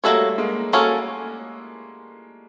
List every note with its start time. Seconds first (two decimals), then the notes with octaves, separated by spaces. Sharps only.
0.04 G3 A3 A#3 C#4 F#4 A4 C#5
0.38 G#3 A#3
0.73 A#3 C#4 F#4 A4 C#5